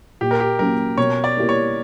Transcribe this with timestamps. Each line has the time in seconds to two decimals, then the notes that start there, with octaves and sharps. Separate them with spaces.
0.21 A#2 G4
0.31 A#4
0.40 G4
0.59 F#3 A#3 C#4 A#4
0.98 B2 C#5
1.24 D5
1.37 A#3 E4 G4 A#4
1.49 C#5